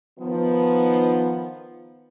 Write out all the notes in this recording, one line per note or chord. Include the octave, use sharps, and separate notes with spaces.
D#3 F3 B3